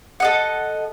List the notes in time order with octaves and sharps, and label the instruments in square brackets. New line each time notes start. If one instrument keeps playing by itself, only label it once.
[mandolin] A4 D#5 F#5